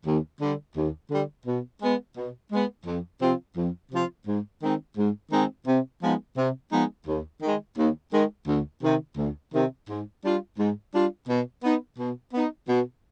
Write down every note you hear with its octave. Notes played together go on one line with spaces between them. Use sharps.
D#2
D3 G3
D#2
D3 G3
B2
G#3 B3
B2
G#3 B3
F2
C3 F3 C4 F4
F2
C3 F3 C4 F4
G#2
D#3 G#3 C4 D#4
G#2
D#3 G#3 C4 D#4
C3
F3 G#3 B3 D#4
C3
F3 G#3 B3 D#4
D#2
D#3
G#3
D#2
D#3 G#3
D2
C3 D#3
D2
C3 D#3
G#2
G3 D4 F4
G#2
G3 D4 F4
B2
B3 D#4
B2
B3 D#4
B2